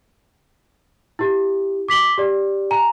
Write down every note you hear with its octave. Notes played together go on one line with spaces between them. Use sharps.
E4 G4
D6 B6 F#7 G7
G4 D5
G#5 A#5